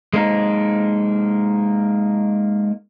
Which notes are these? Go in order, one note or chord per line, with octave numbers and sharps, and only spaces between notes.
G#3 A#3 D#4